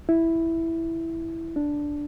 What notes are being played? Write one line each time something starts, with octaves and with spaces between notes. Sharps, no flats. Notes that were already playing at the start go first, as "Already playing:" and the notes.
E4
D4